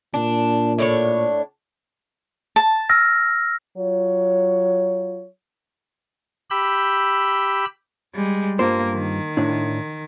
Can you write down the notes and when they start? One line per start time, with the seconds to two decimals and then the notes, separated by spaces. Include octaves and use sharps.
0.14 A#2 D4
0.79 A2 D4 C#5
2.56 A5
2.90 E6 F6 A#6
3.77 F#3 F4 C#5
6.50 G4 B5 E6 G6
8.15 G3 G#3
8.59 G2 A#3 F4 C5
8.92 D#3
9.37 A2 D4 E4